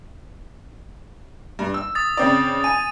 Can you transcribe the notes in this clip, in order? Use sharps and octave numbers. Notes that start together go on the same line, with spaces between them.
G2
E6
D#6 A6
C#3 C4 D5
G#5 D#7